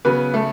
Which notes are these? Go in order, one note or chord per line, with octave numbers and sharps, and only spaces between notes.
C#3 F#3 B3 B4
A3 A4